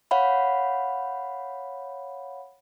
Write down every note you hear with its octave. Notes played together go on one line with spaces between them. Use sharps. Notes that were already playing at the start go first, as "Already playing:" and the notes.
C#5 F5 F#5 B5